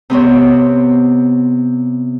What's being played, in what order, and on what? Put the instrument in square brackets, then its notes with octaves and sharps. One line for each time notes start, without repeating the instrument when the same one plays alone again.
[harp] C3 B3 C4 C#5